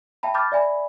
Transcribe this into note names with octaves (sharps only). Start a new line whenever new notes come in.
E5 G5 A5 B5
A5 B5 D6 F6 G6 A6
D5 E5 G#5 B5